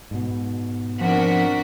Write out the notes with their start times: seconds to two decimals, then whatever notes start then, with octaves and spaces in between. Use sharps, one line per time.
0.11 G#2 B2
1.01 F3 C4 D4 F#4 A#4 B6